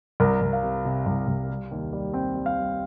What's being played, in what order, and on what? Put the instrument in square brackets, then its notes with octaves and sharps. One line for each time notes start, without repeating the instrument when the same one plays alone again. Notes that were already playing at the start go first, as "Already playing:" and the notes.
[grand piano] C2 A#4
C2
F5
C3
C3
C2
C2
G3
D#2
G3
C4 G5
G3
F5
G3